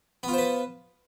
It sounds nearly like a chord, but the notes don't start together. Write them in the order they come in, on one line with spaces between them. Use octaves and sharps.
B3 F4 C5 B4